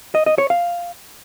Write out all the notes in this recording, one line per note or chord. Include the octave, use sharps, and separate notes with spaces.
D#5
D#5
C#5
F5